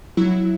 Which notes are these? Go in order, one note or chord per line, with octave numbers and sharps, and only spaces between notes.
F#3 E4